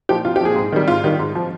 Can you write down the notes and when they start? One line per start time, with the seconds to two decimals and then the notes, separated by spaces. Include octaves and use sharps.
0.09 A#2 F3 G4
0.25 C2 F4
0.36 G4
0.41 A#2 F3 G#4
0.56 G#2
0.72 D#3 G3
0.88 G#2 F4
1.04 D#3 G3
1.19 G#2
1.35 F3